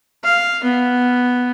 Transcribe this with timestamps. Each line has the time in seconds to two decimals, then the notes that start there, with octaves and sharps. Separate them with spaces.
0.24 F5
0.63 B3